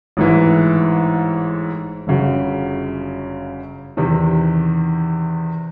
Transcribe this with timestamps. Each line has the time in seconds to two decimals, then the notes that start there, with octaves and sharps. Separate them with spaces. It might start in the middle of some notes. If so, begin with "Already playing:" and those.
0.17 A1 G#2 E3
2.07 G1 F#2 C#3 F#3
3.97 E2 C3 D#3